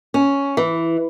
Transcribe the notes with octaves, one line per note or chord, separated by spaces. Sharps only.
C#4
E3